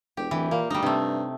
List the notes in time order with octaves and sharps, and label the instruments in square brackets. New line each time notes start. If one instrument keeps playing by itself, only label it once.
[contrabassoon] E1 [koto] G4
[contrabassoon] D1 [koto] E3
[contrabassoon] A#2 [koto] A#3
[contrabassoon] D2 [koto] G3 D#4
[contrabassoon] G2 [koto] C3 A3